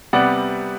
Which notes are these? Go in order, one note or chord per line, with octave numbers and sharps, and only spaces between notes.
C3 G3 B3 D5 F#5